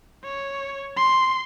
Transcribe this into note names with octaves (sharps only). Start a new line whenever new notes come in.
C#5
C6